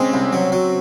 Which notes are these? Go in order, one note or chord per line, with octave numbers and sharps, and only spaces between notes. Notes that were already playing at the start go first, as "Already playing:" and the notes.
Already playing: G#3 C4 C#4
C2
F#3
F#3